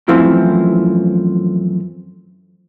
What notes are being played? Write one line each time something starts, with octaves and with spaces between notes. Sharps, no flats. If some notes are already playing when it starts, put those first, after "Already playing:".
F#2 E3 F3 A3 C4 E4